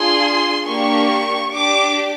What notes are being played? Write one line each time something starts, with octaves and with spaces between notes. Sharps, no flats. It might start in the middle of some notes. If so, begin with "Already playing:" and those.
Already playing: D4 F4 G#4 C6
A#3 D4 G4 C#6
D4 G4 D6